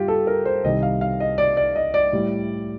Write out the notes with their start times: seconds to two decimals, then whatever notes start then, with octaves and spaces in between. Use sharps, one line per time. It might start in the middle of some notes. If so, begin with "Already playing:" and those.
Already playing: G2 F4 G4
0.08 A4
0.27 A#4
0.45 C5
0.64 C2 C3 D#3 G3 D#5
0.83 F5
1.01 F5
1.20 D#5
1.38 D5
1.57 D5
1.76 D#5
1.94 D5
2.13 A2 G3